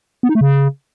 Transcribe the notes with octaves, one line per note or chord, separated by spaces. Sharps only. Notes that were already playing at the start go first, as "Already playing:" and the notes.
B3
D#4
A3
C#3